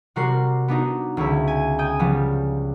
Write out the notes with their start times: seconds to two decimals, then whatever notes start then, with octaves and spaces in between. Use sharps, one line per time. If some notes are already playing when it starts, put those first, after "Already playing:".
0.16 C3 G3 F#4 A#4 C6 C7
0.68 B3 D4 D#4 F#4
1.17 C#2 D3 C#5 E5
1.48 G#5
1.79 G5 G#5 D#6
1.99 C#3 F3 G3 B3